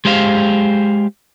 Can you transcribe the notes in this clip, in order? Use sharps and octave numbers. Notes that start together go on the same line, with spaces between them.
G#3 G4 C5 F5